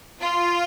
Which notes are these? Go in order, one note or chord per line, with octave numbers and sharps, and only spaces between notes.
F4